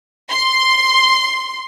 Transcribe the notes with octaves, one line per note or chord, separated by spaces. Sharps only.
C6